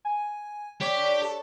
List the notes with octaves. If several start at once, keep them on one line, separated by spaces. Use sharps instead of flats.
G#5
G4 C#5 B6
D3
A4